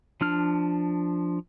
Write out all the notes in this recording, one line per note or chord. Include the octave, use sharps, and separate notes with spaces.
F3 D4 F6